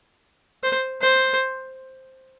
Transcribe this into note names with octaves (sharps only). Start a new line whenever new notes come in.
C5
C5